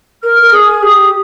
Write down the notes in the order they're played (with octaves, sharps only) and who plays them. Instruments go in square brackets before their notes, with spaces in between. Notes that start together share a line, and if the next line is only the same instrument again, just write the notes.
[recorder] A#4 [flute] F6
[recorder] A#4
[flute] F6
[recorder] G#4 [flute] D#6
[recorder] G4 [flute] D#6